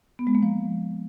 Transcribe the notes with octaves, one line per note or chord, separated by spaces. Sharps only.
B3
G#3
A#3
F3